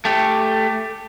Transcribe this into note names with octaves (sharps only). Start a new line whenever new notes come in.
A3 G4